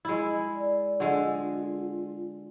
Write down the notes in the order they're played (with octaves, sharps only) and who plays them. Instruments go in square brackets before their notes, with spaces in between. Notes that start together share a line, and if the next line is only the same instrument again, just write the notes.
[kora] G#3 E4
[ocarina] D5
[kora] D3 G#3 [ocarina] F4